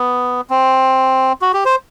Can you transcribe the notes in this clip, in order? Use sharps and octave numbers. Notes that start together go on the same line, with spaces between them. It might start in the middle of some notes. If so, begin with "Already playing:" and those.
Already playing: B3
C4
F#4
G4
C5